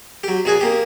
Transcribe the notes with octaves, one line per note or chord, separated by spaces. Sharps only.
F#3 G4
A#1 F#4 G#4 G#5
A#3 G4